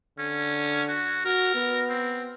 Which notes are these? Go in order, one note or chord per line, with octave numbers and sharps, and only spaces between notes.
D3 C#4
F#4
F#4 A#4
B3
C4